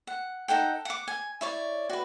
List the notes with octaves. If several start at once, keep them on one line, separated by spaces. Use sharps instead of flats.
F#5
D#4 A4 F#5 G5
F#5 D6
G#5
E4 C#5 D5
F#4 B4